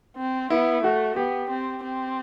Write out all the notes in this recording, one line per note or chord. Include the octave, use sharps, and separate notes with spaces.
C4
B3 E4
A3 F#4
B3 G4
C4
C4